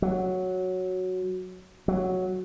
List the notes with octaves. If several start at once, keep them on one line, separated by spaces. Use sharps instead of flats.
F#3
F#3